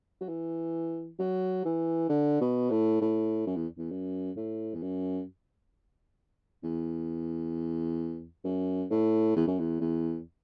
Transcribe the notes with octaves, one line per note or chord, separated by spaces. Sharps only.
F#3
E3
F#3
E3
D3
B2
A2
A2
F#2
E2
E2
F#2
A2
E2
F#2
E2
F#2
A2
E2
F#2
E2
E2